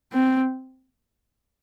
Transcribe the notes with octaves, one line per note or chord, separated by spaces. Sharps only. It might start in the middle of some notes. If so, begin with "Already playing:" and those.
C4